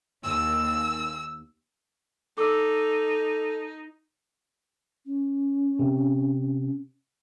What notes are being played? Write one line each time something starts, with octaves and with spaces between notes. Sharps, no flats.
D#2 E6
D#4 A4 D6 E6
C#4
C3